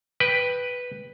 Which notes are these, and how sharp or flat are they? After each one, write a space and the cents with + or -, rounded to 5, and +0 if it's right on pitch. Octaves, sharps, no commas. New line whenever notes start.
B4 +0 G5 +10